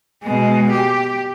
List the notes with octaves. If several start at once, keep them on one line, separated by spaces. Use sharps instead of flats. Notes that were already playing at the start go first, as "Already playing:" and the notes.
B2 G#3
G4